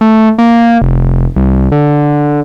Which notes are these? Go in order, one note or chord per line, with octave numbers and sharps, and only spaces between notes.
A3
A#3
F1
C2
D3